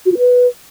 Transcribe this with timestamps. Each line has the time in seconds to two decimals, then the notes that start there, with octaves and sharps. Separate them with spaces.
0.06 F#4
0.12 F4
0.18 B4